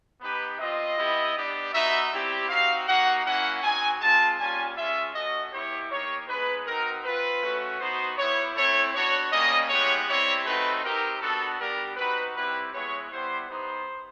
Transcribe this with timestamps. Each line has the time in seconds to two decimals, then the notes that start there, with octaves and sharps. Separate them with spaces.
0.21 B3 D#4 G4 B4
0.59 C4 F4 D#5
0.97 B3 E4 G4
1.36 B3 D4 G4
1.73 B3 D#4 F#4 E5
2.11 G3 C4 E4 G4
2.49 C4 D#4 F#4 F5
2.86 A#3 D#4 F#4 F#5
3.25 A#3 C#4 E4 F#5
3.62 C4 D#4 F#4 G#5
4.00 G#3 C4 F4 A5
4.38 G3 A#3 C#4 F4 G#5
4.76 G#3 C#4 F4 E5
5.14 A3 C#4 F#4 D#5
5.52 B3 E4 G4 C#5
5.90 A#3 D#4 G4 C#5
6.27 G#3 B3 D#4 B4
6.66 C4 D#4 F#4 A#4
7.04 C4 F4 B4
7.42 A3 C#4 F#4
7.80 B3 D#4 F#4 C5
8.17 B3 E4 G4 C#5
8.56 A3 C4 E4 C#5
8.93 B3 D4 F#4 C#5
9.31 G3 A#3 C#4 D#5
9.69 G#3 B3 E4 G4 C#5
10.07 G3 C4 E4 G4 C#5
10.45 A3 C4 D#4 F#4 B4
10.83 C4 D#4 G4 A#4
11.21 B3 D4 F#4 A4
11.59 G3 B3 D4 G4 A#4
11.97 C4 D#4 F#4 B4
12.35 G3 C4 E4 G4 B4
12.72 G#3 B3 E4 C#5
13.11 G3 B3 E4 G4 C5
13.48 B3 D#4 G4 C5